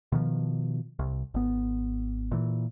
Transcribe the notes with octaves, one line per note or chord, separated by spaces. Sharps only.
B2 D#3 F3
C2
G#1 B3
A#2 E3